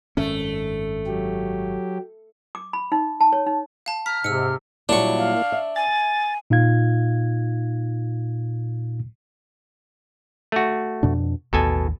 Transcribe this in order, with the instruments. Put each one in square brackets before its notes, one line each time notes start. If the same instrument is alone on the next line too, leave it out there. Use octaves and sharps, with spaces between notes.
[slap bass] G#1 F#2 C#4 [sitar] A3
[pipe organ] F#3 G4
[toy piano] D6
B5
D#4
A5
C#5
D#4
[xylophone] F5 A5
[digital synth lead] A#5 [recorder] F6 [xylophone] B6
[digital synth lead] G#2 [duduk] C3 [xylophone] E6 C#7
[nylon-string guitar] A#2 F#3 G3 [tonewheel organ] A#3 E4 [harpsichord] D4 C#6
[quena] F5
[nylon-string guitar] E5
[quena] G#5 [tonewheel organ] A6
[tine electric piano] A#2 D#4 F4 F5 G#6
[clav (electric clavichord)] A3 F#4
[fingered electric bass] F2 B2 D4
[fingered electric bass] A1 D#2 [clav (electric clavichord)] B2 A4 G#5